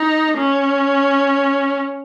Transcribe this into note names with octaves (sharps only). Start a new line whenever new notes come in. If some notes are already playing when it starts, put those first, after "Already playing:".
Already playing: D#4
C#4